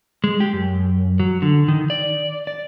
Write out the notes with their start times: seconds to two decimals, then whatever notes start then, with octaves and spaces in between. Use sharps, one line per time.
0.24 G#3
0.40 G4
0.53 F#2
1.20 F#3
1.42 D3
1.68 D#3
1.90 D5
2.47 D5